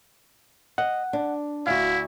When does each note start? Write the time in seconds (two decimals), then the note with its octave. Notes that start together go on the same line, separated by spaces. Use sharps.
0.78 D#5 F#5
1.13 D4
1.67 D2 E4 F#4 F5